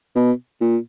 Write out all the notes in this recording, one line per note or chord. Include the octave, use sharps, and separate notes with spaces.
B2
A#2